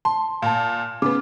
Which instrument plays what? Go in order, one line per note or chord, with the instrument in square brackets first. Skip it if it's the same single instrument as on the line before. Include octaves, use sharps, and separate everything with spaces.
[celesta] A5 [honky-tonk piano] C6
[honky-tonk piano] A#2 [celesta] F5 A5
[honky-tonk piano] C#3 B3 [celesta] D6